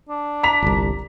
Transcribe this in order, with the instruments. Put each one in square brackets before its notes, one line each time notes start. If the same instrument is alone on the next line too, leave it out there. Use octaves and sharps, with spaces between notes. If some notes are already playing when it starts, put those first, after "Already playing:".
[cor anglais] D4
[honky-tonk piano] A#5 B6 F7
[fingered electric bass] G1 C2